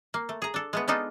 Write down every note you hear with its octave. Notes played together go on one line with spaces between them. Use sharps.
A#3
A3
G#4 A#5
D4 A4
G#3 A3 B3
G#3 B3 D4 D#4 F4 A4